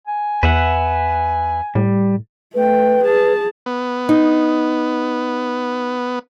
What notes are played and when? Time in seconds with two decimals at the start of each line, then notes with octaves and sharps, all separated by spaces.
0.07 G#5
0.43 E2 B4 E5 F#5
1.75 A2 G3
2.54 A3 B4 G5
3.03 G#4 A5
3.66 B3
4.09 D#4